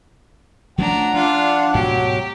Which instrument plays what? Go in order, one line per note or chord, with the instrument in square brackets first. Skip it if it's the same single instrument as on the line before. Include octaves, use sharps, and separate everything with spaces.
[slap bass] F3 A3 C#4 [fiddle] D4 A#5 [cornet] F#5
[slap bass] F3 [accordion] D4 [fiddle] F4
[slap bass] D2 G#2 B2 [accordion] F#3 [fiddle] G4